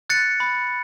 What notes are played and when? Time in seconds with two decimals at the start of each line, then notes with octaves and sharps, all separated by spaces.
0.10 F#6 A6 C#7
0.40 B5